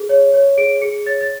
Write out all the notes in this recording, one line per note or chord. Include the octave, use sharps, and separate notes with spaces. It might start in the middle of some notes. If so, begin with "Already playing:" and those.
Already playing: G#4
C#5
C#5
G#4 D7
G#4 C#7
C#5 A6
A6